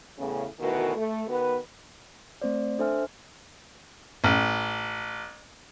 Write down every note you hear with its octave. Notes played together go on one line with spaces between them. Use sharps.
E2 A2 C#3
D2 B2 D#3 E3 F#4 A#4
A3
D#3 B3 F#4 B4
A3 C4 C5 D5
D4 A4 C5 E5 G#5 F6
A1